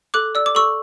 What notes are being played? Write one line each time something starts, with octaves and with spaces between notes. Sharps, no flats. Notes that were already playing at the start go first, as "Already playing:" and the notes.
A4 D6 F#6
D5 E6
D6
A4 C#6 E6